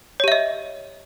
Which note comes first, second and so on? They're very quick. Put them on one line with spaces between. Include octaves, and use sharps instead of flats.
C#5 G4 E5 D#5